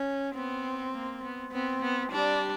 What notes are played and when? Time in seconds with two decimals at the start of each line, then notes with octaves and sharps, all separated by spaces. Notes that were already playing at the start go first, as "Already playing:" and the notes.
Already playing: C#4
0.35 B3 C4
0.94 A#3
1.23 B3
1.52 B3 C4
1.82 B3
2.11 G3 D4